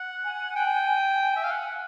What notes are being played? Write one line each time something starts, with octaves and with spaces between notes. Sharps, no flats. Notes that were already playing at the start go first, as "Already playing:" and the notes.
Already playing: F#5
G#5
G5
E5
F5
F#5